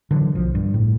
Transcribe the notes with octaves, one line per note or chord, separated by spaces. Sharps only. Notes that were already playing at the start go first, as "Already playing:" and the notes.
D3 E3 F#3
B1 F3
G2
A2